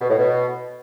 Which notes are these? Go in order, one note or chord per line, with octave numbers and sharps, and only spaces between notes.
B2
A2
B2